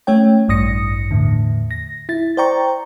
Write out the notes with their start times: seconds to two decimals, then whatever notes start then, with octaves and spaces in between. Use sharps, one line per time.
0.07 A3 C#4 C#5 G5
0.48 A1 G2 D#6 A#6 C#7
1.11 E2 A2 D3
1.71 A#6
2.09 E4 A6
2.37 C5 D5 G5 A#5 C#6